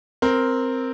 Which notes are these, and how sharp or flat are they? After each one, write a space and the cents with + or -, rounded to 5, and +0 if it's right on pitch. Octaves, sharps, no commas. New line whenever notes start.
C4 +0 A#4 +0